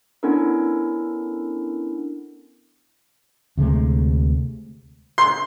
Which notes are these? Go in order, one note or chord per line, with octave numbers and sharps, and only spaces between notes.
B3 C#4 D4 E4 A4 A#4
D2 C3 G#3 A3
C6